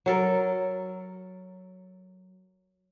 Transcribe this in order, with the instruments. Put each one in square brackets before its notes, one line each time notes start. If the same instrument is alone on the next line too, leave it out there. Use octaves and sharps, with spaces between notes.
[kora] F#3 A4 A#4